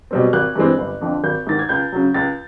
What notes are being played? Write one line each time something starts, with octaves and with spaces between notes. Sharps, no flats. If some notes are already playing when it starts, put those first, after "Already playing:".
B2 G3 C4
G#1 F#6
G2 E3 G#3 C4
G1
F2 D3 F3
G#1 G6
G#2 D#3 A6
G#6
C#2 G6
C#3 F#3
C#2 A6